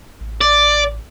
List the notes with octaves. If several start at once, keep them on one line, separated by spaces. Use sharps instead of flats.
A1
D5